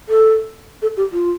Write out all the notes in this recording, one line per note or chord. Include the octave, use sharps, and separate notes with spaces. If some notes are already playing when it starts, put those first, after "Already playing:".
A4
A4
G4
F4